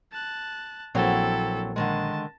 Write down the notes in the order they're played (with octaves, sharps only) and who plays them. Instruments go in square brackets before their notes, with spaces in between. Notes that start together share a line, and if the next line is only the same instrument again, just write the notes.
[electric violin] A5 F#6
[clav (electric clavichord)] A#1 [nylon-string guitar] F#3 C4 C#5 [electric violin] E4 A4
[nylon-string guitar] D3 D#3 G#3 [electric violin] A5